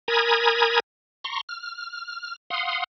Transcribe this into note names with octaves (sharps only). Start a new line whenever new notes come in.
A#4 G#5 A#5 B5 D#6 G#6
A#5 C6 C#6
F6
F5 F#5 C6 D#6